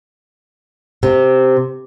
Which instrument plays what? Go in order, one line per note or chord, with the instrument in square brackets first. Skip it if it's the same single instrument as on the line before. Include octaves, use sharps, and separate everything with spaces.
[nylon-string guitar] C3